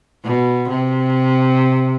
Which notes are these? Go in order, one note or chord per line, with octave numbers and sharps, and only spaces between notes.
B2
C3